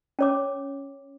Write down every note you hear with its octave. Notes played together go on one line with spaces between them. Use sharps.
C#4 C#5 D6